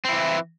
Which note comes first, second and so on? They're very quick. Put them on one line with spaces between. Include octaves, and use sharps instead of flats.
C4 E4 E3